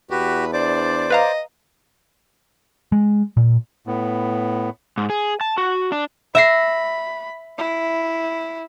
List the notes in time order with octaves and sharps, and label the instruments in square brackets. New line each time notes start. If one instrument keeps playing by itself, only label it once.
[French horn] E2 [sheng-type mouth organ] F#4 G4 [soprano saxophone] B4
[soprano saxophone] D4 [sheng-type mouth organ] C5 D5 D6
[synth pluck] B4 F5 A#5 [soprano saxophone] D#5
[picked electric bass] G#3
A#2
[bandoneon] A2 B3
[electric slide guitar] G#2
G#4
A5
F#4
D4
[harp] E5 A#6 C7 [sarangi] B5
[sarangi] E4